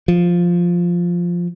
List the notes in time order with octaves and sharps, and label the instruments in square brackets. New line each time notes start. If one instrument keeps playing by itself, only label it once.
[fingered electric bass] F3